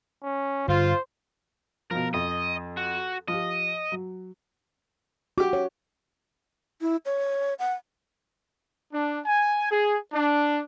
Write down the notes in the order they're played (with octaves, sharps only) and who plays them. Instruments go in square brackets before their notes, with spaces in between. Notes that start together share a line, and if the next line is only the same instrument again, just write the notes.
[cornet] C#4
[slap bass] G2 D3 [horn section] F4 [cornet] C5
[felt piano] B2 F3 [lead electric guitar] A#4
[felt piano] F2 [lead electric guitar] D#5
[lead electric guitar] F#4
[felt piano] F3 G4 [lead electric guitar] D#5
[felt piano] F#3
[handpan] F#4 [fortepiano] G4 D6
[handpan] C#5
[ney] E4
C#5
F#5
[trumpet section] D4
G#5
G#4
D4